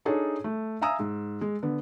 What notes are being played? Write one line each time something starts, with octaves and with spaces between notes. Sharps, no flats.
D4 D#4 G#4 A4 C#5
A3
E5 F5 G#5 A#5 D#6 E6
G#2
G#3
D3 B3